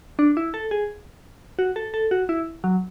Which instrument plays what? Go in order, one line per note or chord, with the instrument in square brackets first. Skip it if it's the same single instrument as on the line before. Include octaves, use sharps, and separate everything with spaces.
[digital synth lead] D4
E4
A4
G#4
F#4
A4
A4
F#4
E4
F#3